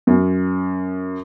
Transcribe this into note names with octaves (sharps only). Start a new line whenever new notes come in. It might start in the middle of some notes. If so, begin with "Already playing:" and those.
F#2